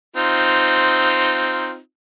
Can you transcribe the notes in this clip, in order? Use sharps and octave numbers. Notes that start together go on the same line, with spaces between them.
C4 D#4 F4